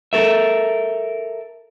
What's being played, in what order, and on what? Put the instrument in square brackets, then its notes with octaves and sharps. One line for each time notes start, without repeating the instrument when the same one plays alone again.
[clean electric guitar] A4 A#4 E5